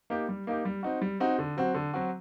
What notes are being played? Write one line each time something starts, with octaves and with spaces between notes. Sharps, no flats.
A#3 D#4 G4
G3
A#3 D#4 G4
G3
C4 D#4 F#4
G3
C4 D#4 F#4
D3
F#3 C4 F#4
D3
F#3 C4 F#4